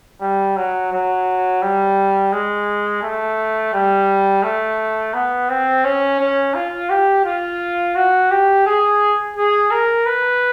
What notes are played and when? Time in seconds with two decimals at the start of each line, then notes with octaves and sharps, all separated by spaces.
0.21 G3
0.56 F#3
0.92 F#3
1.62 G3
2.32 G#3
3.03 A3
3.73 G3
4.43 A3
5.14 B3
5.49 C4
5.84 C#4
6.20 C#4
6.55 F4
6.90 G4
7.25 F4
7.96 F#4
8.31 G4
8.66 G#4
9.37 G#4
9.71 A#4
10.06 B4